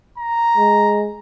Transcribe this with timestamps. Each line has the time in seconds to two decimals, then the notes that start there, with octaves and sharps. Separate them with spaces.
0.18 A#5
0.57 G#3